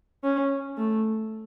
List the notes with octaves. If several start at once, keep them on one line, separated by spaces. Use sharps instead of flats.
C#4
A3